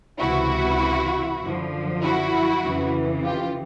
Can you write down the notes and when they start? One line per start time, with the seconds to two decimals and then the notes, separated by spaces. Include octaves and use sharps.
0.19 C#2 C3 E3 E4 F#4
1.41 F#2 D3 F3
2.02 E4 F#4
2.63 F2 C#3 E3
3.24 F4 G4